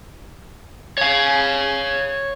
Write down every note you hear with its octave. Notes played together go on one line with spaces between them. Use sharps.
C#5 F5